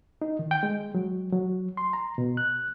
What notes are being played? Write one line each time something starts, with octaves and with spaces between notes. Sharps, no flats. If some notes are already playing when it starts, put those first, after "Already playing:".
D#4
D#3
G5
G#3
F#3
F#3
C6
A#5
B2
F#6